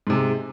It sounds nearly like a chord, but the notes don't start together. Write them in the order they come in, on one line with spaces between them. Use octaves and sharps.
G#2 C3 G#3